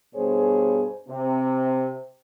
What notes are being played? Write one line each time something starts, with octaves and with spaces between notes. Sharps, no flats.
G2 B2 G#4 C5 C#5
C3